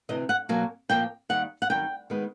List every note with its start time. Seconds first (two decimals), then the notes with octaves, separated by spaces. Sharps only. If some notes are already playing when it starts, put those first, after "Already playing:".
0.09 D2 C3 E3 D#5
0.29 F#5
0.49 B2 F#3 A#3 G#5
0.89 A#2 F3 A#3 G5
1.29 D#2 D#3 G3 F#5
1.62 F#5
1.69 F#2 D#3 G3 G5
2.10 D#3 G#3 B3